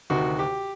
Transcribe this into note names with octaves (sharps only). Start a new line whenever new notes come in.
D2 C3 D#3 F#4
G4